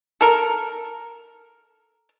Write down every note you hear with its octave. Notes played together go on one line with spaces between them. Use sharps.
A4 A#4